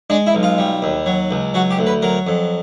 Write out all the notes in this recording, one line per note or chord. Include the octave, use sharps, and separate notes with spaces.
G#3 D4
E4
B1
F4
G3
D#2
F#3
C#2
F#3 F#4
G4
D2
B4
F#3 A#4
F2